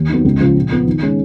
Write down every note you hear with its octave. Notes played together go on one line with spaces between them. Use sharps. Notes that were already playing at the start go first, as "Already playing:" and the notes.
Already playing: D#2
D#3 F#3 B3
C#2
C#3 F3
A#2
F3 B3
D#3
G#3 C#4